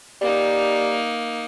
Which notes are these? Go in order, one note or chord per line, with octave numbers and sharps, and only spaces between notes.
G3 A#3 D#4